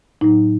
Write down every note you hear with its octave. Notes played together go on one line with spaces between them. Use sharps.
A2 F#3 D#4